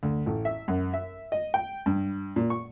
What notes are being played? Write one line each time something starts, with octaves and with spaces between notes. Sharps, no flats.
D2
A1
E5
F#2
E5
D#5
G5
G2
A#2
C#6